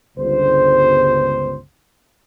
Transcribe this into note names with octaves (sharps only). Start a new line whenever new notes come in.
G1 C#2 C5